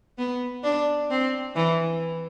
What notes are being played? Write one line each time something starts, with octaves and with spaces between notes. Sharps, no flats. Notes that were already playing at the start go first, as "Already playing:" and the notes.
B3
D4
C4
E3